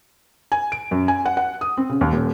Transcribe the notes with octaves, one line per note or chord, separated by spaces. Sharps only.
G#5
D7
F#2
G#5
F#5
F#5
D#6
C4
C#3
D#2
D#1